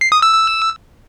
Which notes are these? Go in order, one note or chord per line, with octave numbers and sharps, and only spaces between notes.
C7
D#6
E6
E6